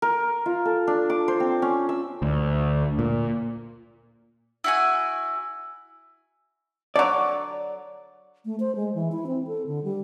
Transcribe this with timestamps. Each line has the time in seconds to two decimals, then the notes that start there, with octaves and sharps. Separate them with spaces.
0.02 A#4
0.46 F4
0.65 A4
0.87 D4
1.10 D6
1.28 C5
1.40 C4
1.62 C#4
1.89 E6
2.22 D2
2.99 A#2
4.64 E4 F#4 G#5
6.96 D3 F#3 D5
8.45 A3
8.60 C5
8.75 G#3
8.95 E3
9.12 E4
9.27 C4
9.47 A4
9.67 D3
9.84 G3